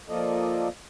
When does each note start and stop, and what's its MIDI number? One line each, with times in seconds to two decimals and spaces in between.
0.09 0.68 53
0.09 0.68 58
0.09 0.68 65
0.09 0.68 69
0.09 0.68 74
0.09 0.68 75